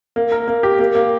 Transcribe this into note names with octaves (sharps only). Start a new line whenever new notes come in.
A#3
A#4
A#3
G4
A#3
A#3